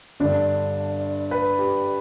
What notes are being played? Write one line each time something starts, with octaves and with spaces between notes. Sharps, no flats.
G1 G2 D3 D4
B4
G4